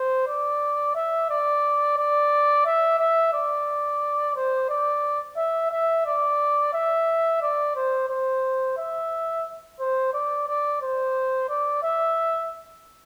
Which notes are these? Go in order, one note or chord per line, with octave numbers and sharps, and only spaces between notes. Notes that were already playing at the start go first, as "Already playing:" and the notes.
Already playing: C5
D5
E5
D5
D5
E5
E5
D5
C5
D5
E5
E5
D5
E5
D5
C5
C5
E5
C5
D5
D5
C5
D5
E5